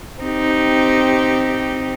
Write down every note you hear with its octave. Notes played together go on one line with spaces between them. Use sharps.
C4 D#4 G4